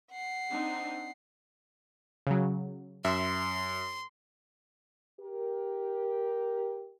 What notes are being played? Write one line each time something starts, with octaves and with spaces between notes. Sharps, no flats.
F#5 C7
C4 D4 D#4
C#3 F#3
F#2 E5 C6
G4 A#4